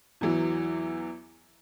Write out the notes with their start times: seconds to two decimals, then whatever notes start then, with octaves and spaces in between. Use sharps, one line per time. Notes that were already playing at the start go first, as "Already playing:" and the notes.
0.21 E2 E3 F#3